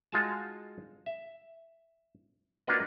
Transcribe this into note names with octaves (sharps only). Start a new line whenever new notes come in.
G#3 D#4 F4 F#4 G#5 A5
E5
A#3 D4 F4 F#4 B4 D#5